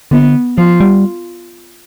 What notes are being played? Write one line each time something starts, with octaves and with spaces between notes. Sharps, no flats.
D3 B3
F3 F4
G3